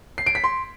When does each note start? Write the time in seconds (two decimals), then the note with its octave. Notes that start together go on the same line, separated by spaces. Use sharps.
0.18 C7
0.26 D7
0.35 B6
0.44 C6